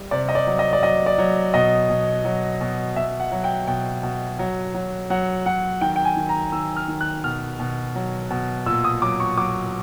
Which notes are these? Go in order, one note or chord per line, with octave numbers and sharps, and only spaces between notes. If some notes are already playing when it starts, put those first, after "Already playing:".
Already playing: G3
C3 D5
D#5
D5
F#3
D#5
D5
F#3 D#5
D5
F#3
B2 D#5
B2
F#3
B2
B2 E5
F#5
F#3
G5
B2 G5
B2
F#3
F#3
F#3 F#5
F#3 F#5
D#3 G5
G5
G#5
D#3
A#5
D#3 E6
F6
D#3
F#6
B2 F6
B2
F#3
B2
A#2 E6
D#6
F#3 D6
C#6
F#3 D6